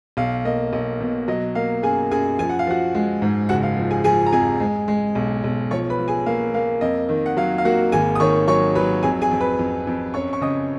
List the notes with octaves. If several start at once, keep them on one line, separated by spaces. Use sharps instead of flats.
B1 F5
A#3 D#5
B1 D#5
B2
F#3 D#5
A#3 F5
F#2 G#4 G#5
F#2 G#4 G#5
F3 G#5
F#5
F5
F3 F#4 F#5
G#3
G#2
F#1 F#4 F#5
F5
F3
G#4 G#5
F3 G#4 G#5
A#5
F2 G#4 G#5
G#3
G#3
B1
B1
F3 C#5 C#6
B4 B5
F3
G#4 G#5
A#3 F5
A#3 F5
F2 D#5
D#3
F#5
F#3 F5
F5
A#3 F#4 F#5
G#1 G#4 G#5
D#6
D#3 C#5 C#6
F#3 C#5 C#6
F#3 B4 B5
F2 G#4 G#5
G#4 G#5
F2
B4 B5
F2
F2
F#2 C#5 C#6
C#6
C#3 D#5 D#6